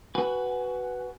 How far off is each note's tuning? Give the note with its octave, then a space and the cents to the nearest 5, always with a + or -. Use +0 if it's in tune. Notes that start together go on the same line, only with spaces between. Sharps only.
F#4 +15 B4 +0 G#5 +0